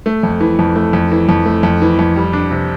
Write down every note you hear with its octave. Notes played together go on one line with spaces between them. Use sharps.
A3
F2
E3
F2
A3
F2
E3
F2
A3
F2
E3
F2
G3
D4
C3